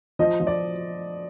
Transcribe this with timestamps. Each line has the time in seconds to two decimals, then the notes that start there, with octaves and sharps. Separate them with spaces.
0.19 F3 D#5
0.40 F3
0.47 D5